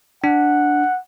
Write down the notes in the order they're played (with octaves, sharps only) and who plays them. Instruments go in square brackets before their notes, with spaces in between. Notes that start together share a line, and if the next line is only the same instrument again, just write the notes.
[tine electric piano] D4 [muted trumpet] F#5